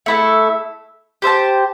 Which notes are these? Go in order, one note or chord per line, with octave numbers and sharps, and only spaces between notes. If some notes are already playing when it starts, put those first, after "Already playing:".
A3 E4 A4
G4 C5 E5 A5